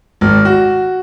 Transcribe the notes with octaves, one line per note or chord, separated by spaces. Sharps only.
G#1
F#4